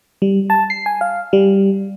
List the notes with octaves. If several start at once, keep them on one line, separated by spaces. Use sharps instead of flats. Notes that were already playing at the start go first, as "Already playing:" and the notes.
G3
A5
C7
G#5
F5
G3